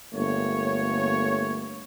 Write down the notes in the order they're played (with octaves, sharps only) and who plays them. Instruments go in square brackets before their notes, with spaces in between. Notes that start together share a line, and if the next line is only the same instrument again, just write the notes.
[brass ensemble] G1 A3 A#3 C#5